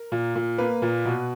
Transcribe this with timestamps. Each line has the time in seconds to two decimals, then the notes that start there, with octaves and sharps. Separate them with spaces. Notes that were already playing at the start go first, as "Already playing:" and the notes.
Already playing: A#4
0.12 A#2
0.36 A#2
0.58 A#3 B4
0.82 A#2
1.06 B2